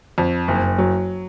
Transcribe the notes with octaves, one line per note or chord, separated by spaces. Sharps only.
F2
F#1
F#3